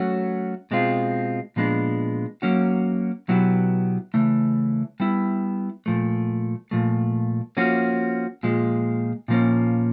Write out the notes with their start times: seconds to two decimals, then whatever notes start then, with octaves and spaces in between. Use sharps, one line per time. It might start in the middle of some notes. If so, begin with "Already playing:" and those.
Already playing: F#3 A3 C#4 F#4
0.71 B2 G#3 C4 F4
1.56 A#2 F3 G#3 B3 D4
2.42 F#3 A#3 C#4 F#4
3.28 B2 F#3 B3 E4 G4
4.14 C#3 E3 A3
5.00 G3 B3 E4
5.86 A#2 F3 A3
6.71 A#2 F3 A3
7.57 F3 A#3 C#4 F#4
8.43 A#2 F3 G#3
9.28 A#2 F3 A#3 C#4